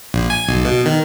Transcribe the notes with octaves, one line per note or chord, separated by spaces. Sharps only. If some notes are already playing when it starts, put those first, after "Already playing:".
A#1
G#5
B1
B2
D#3